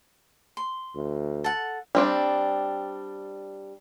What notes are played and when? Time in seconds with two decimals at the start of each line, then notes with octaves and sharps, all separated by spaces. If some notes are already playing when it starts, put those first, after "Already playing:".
0.57 C6
0.95 D2
1.44 A4 F#5
1.95 G3 C4 D4